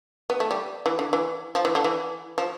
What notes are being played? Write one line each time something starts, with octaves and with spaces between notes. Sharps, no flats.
B3
A3
G3
E3
D3
E3
F3
E3
D3
E3
F3